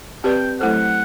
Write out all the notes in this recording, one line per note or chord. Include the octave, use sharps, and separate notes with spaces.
C4 G4 B4 D5 G5
F#3 A3 E4 A4 C5 F#5